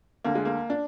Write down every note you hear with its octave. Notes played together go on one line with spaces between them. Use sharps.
D2 D3 A#3
G#3
A#3
D4